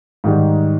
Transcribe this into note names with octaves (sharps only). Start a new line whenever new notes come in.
G#2 D#3 G3